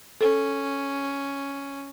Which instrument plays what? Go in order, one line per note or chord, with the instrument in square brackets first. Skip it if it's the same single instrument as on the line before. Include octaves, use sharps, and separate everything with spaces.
[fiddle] C#4 [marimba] A4